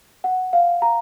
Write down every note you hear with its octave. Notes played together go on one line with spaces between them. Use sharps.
F#5
F5
A#5